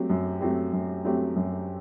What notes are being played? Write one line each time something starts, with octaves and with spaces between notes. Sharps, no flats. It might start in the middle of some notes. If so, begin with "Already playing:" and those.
Already playing: F#3 A3 C4 G4
F#2
F#3 A3 C4 G4
F#2
F#3 A3 C4 G4
F#2